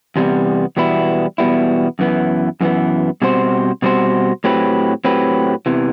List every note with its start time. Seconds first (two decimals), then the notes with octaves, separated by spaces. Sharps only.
0.16 E2 C3 G3 B3
0.77 E2 B2 G3 B3 E4
1.38 E2 B2 G3 B3 E4
1.99 F#2 E3 B3
2.61 F#2 E3 B3
3.22 B2 G3 C4 F#4 C5
3.82 B2 G3 C4 F#4 C5
4.44 A2 F#3 C4 G4 B4
5.04 A2 F#3 C4 G4 B4
5.66 E2 C3 E3